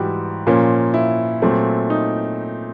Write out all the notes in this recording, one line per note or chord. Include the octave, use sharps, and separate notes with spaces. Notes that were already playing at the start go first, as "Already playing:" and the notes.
Already playing: G#2 E3 G3 F#4 G4
A#2 F3 A#3 C#4 F4
E4
A#2 F#3 A3 C4
D#4